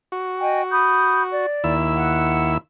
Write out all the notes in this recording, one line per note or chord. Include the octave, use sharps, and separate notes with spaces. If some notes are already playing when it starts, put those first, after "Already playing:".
F#4
D#5 G5 G#5
B5 D#6 G6
D5
D#2 E4 E6
F#5